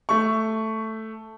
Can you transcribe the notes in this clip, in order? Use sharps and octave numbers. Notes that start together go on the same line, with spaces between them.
A3 C#6